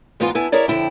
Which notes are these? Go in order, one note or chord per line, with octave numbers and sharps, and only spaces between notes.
G#2 E3 B3 D4 D#4 F4
B3 D4 E4 G#5
E4 G#4 A#4 C#5 D5
F2 D3 E4 G5